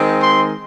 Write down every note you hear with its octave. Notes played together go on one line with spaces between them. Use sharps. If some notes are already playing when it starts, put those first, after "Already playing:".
Already playing: D#3 G#3 C4
C6